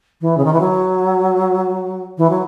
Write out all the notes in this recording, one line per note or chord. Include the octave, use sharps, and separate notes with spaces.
E3
C#3
D#3
E3
F#3
E3
F#3